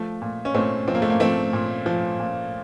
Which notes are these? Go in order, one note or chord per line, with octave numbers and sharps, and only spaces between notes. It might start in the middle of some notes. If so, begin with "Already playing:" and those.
Already playing: F3 A3
A#2
C#4
A#2 A3 C4
F3 C4
A#3
A3
A#3
F3 A3 C4
A#2
F3
A#2